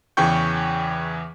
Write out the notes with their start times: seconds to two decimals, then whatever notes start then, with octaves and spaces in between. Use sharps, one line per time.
0.17 E2 C#3 E3 G5 C#6 G6